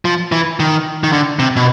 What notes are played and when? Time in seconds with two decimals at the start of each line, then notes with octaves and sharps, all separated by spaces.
0.05 F3
0.32 E3
0.60 D#3
1.03 D#3
1.12 D3
1.39 C3
1.56 B2